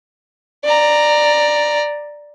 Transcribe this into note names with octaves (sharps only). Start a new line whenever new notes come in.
D5 A#5